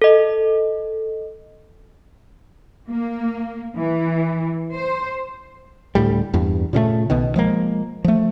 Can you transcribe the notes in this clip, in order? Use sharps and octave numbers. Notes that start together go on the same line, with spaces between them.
A4 D#5
A#3
E3
C5
D2 A2 G3
E2 G2
A#2 C#3 G#3 A3
B1 B2 D#3
F3 G#3 A#3
F3 A3